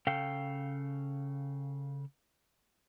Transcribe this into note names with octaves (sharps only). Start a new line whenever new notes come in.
C#3 A4 F5 G5